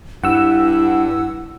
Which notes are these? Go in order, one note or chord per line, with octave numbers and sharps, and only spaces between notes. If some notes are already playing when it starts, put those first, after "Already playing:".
G2 E4 F#5 E6